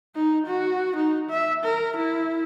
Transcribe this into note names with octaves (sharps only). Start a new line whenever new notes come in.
D#4
F#4
D#4
E5
A#4
E4